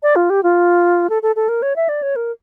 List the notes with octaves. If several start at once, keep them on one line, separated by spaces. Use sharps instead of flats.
D5
F4
G4
F4
A4
A4
A4
A#4
C#5
E5
D5
C#5
A#4